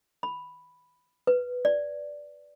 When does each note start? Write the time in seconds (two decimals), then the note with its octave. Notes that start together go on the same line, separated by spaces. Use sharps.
0.23 B5
1.27 B4
1.65 D5